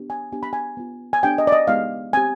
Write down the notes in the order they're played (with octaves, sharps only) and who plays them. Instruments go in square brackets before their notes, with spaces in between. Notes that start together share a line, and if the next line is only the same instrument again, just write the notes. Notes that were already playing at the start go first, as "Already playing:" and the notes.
Already playing: [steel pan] B3 D4 G4
G#5
B3 D4 G4 G#5
B5
G#5
B3 F4
G#5
B3 D4 G4 G5
D#5
D5
D#5
G#3 B3 D#4 G4 F5
C4 G4 G#5